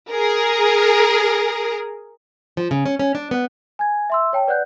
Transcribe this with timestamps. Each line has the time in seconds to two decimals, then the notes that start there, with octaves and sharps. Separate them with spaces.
0.11 G#4 A#4
2.57 F3
2.71 C#3
2.86 C#4
2.99 C#4
3.15 D4
3.31 B3
3.79 G#5 G#6
4.10 E5 C6 E6
4.33 C#5 G5 A5
4.47 B4 D5 F#5 F#6 G6